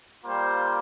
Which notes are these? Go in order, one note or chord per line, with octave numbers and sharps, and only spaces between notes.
G3 A#3 F4 C5